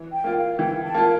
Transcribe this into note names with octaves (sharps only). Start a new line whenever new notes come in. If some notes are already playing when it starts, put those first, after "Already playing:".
Already playing: E3
G5
A#3 F4
F5
E3 G5
A5
A#3 F4